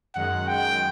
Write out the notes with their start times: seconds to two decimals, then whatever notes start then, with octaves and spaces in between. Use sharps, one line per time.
0.15 F#2 D#3 G#3 F#5
0.48 G5